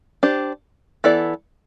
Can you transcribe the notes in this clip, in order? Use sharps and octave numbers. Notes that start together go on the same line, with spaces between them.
D4 G4 C5
E3 B3 E4 A4 D5